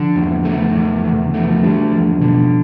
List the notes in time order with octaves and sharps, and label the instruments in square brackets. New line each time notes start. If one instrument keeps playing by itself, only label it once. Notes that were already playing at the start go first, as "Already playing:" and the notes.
Already playing: [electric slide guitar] D3 [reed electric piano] F3
[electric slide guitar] E2
A3
E2
E2
[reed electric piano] C3
D3
[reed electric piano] E3 [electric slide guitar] A3
[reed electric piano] F3
[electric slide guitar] D3 [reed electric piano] G3
[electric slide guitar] E2 [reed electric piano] F3
[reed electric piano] B2 [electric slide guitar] D3